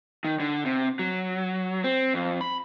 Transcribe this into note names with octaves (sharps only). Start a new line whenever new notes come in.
D#3
D3
C3
F#3
C4
F2
B5